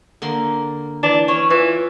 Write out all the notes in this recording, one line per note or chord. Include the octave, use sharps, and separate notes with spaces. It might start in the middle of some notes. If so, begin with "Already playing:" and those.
D3 A#3 C6
E3 D4
C#4 B4 C#5
E3 F4